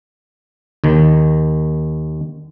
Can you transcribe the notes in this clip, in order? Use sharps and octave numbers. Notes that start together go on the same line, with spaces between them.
D#2 D#3